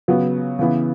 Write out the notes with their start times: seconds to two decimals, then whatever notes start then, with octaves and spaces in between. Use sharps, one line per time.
0.08 C#3 F#3 B3
0.59 C#3 E3 B3 E4